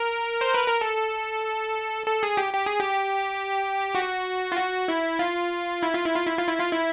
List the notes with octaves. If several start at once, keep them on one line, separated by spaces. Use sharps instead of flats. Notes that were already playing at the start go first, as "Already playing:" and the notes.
Already playing: A#4
C5
B4
A#4
A4
A4
G#4
G4
G4
G#4
G4
F#4
F4
F#4
E4
F4
E4
F4
E4
F4
E4
F4
E4
F4
E4